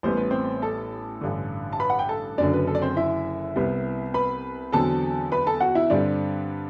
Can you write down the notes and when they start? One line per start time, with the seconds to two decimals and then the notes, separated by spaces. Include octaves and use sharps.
0.03 A1 A2 G3 B3 C5
0.17 B4
0.31 C4 C5
0.62 A4 A5
1.21 A1 G2 D3
1.73 A5
1.79 B4 B5
1.90 F#5
1.99 G5
2.09 A4 A5
2.38 F#1 F#2 D3 D4 D5
2.54 B4
2.67 A4
2.75 D5
2.82 C4 C5
2.97 E4 E5
3.56 C2 C3 G3 B3
4.14 B4 B5
4.72 E2 D3 F#3 C4 A4 A5
5.32 B4 B5
5.47 A4 A5
5.60 F#4 F#5
5.75 E4 E5
5.90 G2 D3 G3 C4 D4 D5